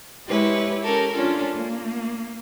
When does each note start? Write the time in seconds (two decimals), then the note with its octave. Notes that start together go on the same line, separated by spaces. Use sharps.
0.26 G#3 E4 G4 B4 C#5
0.84 C#4 G4 A4 A#4
1.12 C#4 D4 F4 A4
1.54 A#3